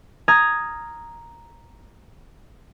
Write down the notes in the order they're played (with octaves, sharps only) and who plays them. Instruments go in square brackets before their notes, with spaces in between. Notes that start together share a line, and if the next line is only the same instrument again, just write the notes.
[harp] A#5 D#6 F6 G#6